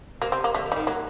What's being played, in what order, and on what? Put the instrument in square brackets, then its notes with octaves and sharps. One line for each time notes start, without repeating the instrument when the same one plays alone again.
[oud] C3 [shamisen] A#3
[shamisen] C4
A#3
[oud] D3 [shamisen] A3
[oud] D#3
[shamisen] G3
[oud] D#3
[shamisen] F#3 [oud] A#3